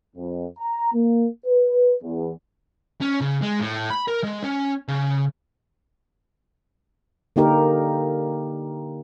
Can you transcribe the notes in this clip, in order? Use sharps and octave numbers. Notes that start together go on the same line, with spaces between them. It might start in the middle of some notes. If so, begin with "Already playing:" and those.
F2
A#5
A#3
B4
E2
C#4
C#3
G#3
A2
B5
A#4
G#3
C#4
C#3
D3 A#3 D#4 G4 A#4